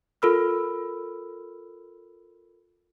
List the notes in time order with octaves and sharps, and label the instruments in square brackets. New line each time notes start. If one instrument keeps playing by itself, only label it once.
[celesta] F4 A4 A#4 B5 E6 F6